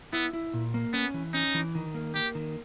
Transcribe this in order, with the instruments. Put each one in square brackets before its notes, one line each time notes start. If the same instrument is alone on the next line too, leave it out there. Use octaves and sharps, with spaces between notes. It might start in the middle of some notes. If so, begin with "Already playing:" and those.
[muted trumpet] B3 [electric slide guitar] E4
[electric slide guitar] E4
A#2
A#3
[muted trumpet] B3 [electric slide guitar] C#4
[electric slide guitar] E3
[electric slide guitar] C#4 [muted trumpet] D#4
[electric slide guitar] E3
D#3
A#3
[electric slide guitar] A#3 [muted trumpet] G4
[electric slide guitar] D#3